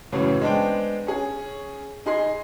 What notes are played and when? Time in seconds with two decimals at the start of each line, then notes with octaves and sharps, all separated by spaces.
0.12 F#2 A2 C#3 E3 F#3
0.41 G#3 B3 D4 C5 G5
1.07 C#4 G#4
2.06 D#4 G#4 C6 C7